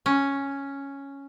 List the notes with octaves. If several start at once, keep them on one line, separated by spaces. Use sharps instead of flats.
C#4